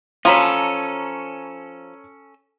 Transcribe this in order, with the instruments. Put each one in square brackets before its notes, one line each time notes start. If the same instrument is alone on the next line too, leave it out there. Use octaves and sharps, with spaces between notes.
[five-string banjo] F3 B5 [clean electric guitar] C#4 A4 [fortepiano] C#5 A#5